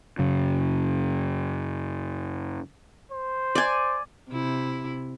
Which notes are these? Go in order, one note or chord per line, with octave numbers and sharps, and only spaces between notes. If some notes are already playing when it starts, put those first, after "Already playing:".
F#2 C#3
C5
D5 G#5
C3 E4